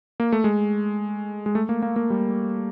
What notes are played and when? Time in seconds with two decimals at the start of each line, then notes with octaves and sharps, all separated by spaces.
0.20 A#3
0.32 A3
0.44 G#3
1.46 G#3
1.55 A3
1.69 A#3
1.82 A#3
1.96 A#3
2.10 G3